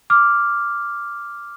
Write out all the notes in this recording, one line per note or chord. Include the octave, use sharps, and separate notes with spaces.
D6 F6